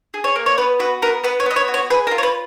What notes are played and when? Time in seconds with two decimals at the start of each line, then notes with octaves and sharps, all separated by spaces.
0.14 G#4
0.24 C#5
0.36 A#3
0.46 C#5
0.58 B3 B4
0.79 F#4 B4
1.02 B3 A#4
1.23 B3 B4
1.40 C#5
1.46 B3 D#5
1.56 C#5
1.68 F#4
1.74 C#5
1.90 G#4 B4
2.07 A#4
2.11 F4
2.18 C#5
2.23 B4